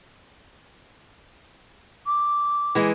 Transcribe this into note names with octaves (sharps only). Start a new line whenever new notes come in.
D6
E3 G#3